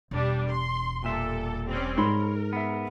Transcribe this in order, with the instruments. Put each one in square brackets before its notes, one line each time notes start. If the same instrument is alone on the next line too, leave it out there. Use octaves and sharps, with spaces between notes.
[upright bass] E1 [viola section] G3 D4 G4
[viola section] C6
[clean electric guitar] A#2 E5 [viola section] G3 A4
[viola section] G3 C4 C#4
[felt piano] G#2 [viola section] A#4 [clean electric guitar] C#5 B5 C6
[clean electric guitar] B3 E5